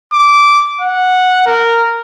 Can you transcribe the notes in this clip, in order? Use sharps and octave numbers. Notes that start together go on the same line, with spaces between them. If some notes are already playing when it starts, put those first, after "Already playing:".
D6
F#5
A#4